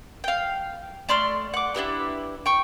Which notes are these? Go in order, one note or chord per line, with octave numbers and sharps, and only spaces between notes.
F5 G5
A3 D5 C6 F6
F#5 D6
D4 E4 G4 B4
G5 C#6